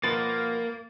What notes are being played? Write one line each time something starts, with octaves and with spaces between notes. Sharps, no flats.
B2 F3 A#3 B4 A6